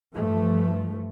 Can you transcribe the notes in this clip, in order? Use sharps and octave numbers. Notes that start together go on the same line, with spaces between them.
G2 E3 F3 A3